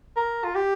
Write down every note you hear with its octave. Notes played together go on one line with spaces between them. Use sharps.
A#4
F4
G4